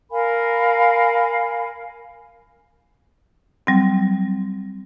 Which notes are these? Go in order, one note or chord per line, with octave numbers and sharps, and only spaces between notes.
A#4 F5 G#5 B5
F#3 G3 C4